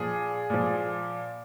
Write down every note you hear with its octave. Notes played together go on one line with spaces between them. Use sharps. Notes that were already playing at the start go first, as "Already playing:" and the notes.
Already playing: A#2 F3 G#4
A#2 F3